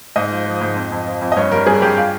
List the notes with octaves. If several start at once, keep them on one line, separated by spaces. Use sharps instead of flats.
G#2 D#5
F3
F3
G#2
F2
F2
F3
F2
D#5
G2 C#5
G3 A#4
G3 G#4
G2 G4
F4